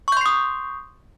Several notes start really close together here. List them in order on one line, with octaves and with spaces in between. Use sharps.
C#6 G6 C6 C7 D#6